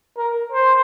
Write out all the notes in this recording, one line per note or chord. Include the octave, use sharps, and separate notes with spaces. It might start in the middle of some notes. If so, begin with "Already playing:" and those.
A#4
C5